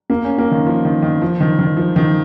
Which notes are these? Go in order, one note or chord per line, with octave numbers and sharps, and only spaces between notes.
A#3
C#4
A#3
D#3
F3
D#3
D#3
F3
D#3
D#3
F3
D#3